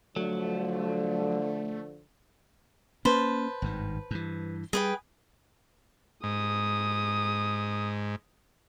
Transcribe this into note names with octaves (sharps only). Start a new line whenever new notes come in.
D3 F3 F#3 A3
A#3 C#4 B4 C5 A5
G#1 G2 D#3
G2 E3
G3 G#4 B4 G5
G#2 D#6